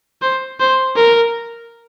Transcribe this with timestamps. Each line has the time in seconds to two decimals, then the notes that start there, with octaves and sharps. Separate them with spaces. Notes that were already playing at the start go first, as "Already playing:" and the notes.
0.22 C5
0.60 C5
0.96 A#4